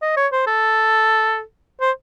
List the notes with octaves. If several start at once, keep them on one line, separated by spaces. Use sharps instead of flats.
D#5
C#5
C5
A4
C5